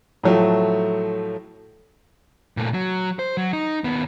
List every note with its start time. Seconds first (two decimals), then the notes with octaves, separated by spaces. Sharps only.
0.23 A2 F3 F#3 A3
2.57 A#2 A3
2.74 F#3
3.19 C5
3.37 F#3
3.53 D#4
3.84 D#2 B3